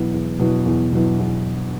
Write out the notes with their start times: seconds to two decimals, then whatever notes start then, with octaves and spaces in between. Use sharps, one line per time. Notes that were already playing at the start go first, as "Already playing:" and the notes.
Already playing: E2 B2 F#3 B3 E4
0.14 E2
0.39 B2 F#3 B3 E4
0.66 E2
0.93 B2 F#3 B3 E4
1.19 E2